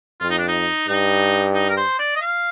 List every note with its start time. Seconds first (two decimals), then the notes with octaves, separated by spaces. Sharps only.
0.21 F2 F4
0.30 D#4
0.38 D4
0.48 D#4
0.88 G2 D#4
1.54 D#4
1.69 A#4
1.77 C5
1.99 D5
2.16 D#5
2.21 F5